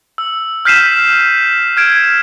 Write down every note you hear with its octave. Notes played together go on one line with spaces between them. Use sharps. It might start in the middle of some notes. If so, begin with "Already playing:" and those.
E6
F6 G6 B6 C7 D#7 E7
F6 G#6 D7 E7